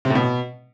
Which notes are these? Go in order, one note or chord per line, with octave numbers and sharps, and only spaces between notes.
C3
A2
B2